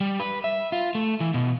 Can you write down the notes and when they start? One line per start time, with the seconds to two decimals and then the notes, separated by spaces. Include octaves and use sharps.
0.01 G3
0.20 B4
0.44 E5
0.72 F4
0.95 A3
1.20 E3
1.34 B2